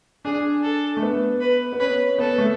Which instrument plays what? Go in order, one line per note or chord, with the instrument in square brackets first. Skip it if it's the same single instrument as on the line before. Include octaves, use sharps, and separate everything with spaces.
[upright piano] D4 [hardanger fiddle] G#4
[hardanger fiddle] A4
[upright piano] A3
B3
[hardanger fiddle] B4
[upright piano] B3
[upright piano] C#4 [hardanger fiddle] B4
[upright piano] B3 [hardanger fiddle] A4
[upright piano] A3